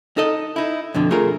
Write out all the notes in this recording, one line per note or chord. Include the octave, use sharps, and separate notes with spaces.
D#4 A4 D#5
D#4 E4
F2 B2 D3
A3 F4 G#4 A#4